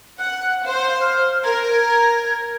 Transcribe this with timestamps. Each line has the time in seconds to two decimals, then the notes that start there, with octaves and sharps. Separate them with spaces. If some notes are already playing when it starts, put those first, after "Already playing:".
0.19 F#5 F#6
0.63 C5 F5
1.01 F6
1.44 A#4 G#6